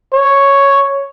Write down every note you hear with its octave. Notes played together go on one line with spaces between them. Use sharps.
C#5